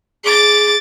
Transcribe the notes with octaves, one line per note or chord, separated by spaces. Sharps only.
G#4 D6 A6